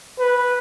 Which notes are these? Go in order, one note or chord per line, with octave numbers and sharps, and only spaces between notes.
B4